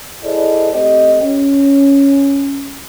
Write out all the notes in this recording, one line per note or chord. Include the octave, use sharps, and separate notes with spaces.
E4 G#4 A4 C5 D5 D#5
A3 C4 G4 C5 D#5
C#4